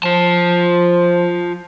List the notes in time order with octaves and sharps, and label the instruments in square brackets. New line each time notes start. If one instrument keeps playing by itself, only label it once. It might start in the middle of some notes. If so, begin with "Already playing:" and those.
[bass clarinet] F3 [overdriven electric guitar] F4 A5